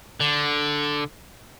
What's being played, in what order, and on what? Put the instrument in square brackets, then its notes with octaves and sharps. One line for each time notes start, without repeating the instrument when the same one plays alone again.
[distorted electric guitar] D3